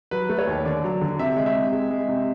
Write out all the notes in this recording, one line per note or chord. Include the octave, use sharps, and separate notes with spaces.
F#3 B4
A3
C#5
D#2
D3 D5
F#3
D3
C3 E5
G#3
E5
C3
G#3
G#3
C3